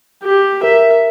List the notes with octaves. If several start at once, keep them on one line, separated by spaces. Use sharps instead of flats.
G4
A#4 E5